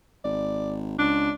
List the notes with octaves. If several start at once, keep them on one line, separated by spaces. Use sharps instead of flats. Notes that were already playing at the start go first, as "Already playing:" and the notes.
G#1 D5
C#2 D4